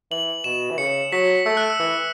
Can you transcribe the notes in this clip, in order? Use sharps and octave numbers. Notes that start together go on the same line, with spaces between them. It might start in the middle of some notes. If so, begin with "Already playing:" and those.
E3 F#7
B2 E7
E3
C#3 C#7
F#3 B6
A3 E6
F#6
E6
E3